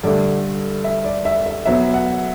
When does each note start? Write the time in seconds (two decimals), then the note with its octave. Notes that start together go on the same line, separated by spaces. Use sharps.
0.03 G2 D3 A3 D5
0.84 E5
1.04 D5
1.25 E5
1.46 E5
1.66 B2 F#3 B3 E5
1.94 F#5